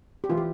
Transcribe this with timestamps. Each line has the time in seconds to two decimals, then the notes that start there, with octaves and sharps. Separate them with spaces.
0.24 G4
0.30 E3 F4
0.37 G4